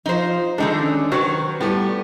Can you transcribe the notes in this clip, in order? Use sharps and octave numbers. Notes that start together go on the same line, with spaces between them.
F3 D#4 C5
D#2 D3 G#3 D4 D#4 A4
C#4
D#3 F#3 F#4 B4 C5
B4
A2 G3 A3 B3 G4